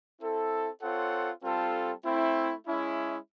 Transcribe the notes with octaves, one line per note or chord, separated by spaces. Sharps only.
C4 E4 A4
C4 F4 A4 C#5 F#5
G3 C4 F4 A4
A3 C4 E4
G#3 C#4 E4